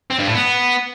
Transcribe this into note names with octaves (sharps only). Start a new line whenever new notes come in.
C4
G2
A2
B3